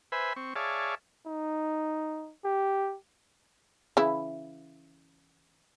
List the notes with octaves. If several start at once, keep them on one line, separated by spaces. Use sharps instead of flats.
B4 C5 E5 G#5 B5
C4 C#6
G#4 C#5 D5 E5 F5 A5
D#4
G4
C#3 E3 E4